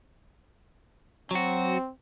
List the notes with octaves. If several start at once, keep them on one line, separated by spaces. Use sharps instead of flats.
F#3 C4 F#4